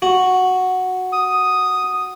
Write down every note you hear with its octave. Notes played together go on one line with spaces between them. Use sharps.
F#4
D#6